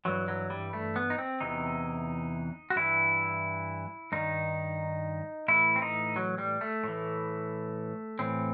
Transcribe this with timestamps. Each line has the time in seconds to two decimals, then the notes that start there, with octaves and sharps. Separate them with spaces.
0.05 G2 E3 F#3
0.28 F#3
0.50 G3
0.73 A3
0.96 B3
1.10 D#4
1.18 C4
1.41 E2 C3 E3 D#4
2.70 F#4
2.76 G2 E3 E4
4.12 G2 D#3 D#4
5.48 A2 E3 E4
5.76 C4
5.82 D#4
6.16 F#3
6.38 G3
6.61 A3
6.84 A2 E3
8.19 A2 E3 C4